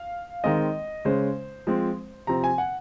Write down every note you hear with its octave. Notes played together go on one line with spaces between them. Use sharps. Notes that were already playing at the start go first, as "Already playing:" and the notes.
Already playing: F5
D#3 G#3 C4 D#5
C#3 G#3 C#4 C5
F3 G#3 C4
C3 F3 C4 A#5
G#5
F#5